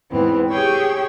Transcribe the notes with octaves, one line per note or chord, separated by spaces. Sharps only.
E2 G#2 E3 B3 C4
G4 G#4 C#5 G5 C#6 E6